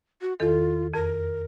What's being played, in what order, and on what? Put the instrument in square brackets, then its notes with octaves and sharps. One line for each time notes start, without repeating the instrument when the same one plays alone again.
[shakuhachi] F#4
[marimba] E2 D#3 A4 [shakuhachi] F4
[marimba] F2 [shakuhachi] A#4